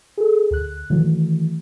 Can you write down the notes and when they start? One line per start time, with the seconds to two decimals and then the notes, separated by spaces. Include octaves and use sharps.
0.18 G#4 A4
0.51 D2 F#6
0.90 D#3 E3 F#3 A3